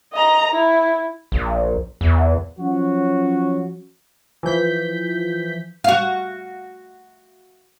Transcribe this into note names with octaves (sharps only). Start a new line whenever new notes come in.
D#5 A#5
E4
A#1
E2
F3 F#3 C#4 F#4
E3 F3 G6 B6
F#4 F5